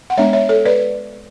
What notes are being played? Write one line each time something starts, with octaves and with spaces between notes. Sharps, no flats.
F#5
G#3 B3 D4 C#5 E5
C#5 E5
A4 C#5
B4 D5